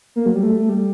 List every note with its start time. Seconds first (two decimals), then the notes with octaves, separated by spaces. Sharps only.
0.16 A#3
0.26 F#3
0.35 G3
0.43 A3
0.59 A3
0.69 G3